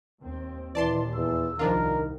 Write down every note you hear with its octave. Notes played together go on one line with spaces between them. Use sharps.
D#2 C4
D#2 A#2 E3 D5 A5 C6
E2 E6
C2 D#3 F3 D4 F4 A#4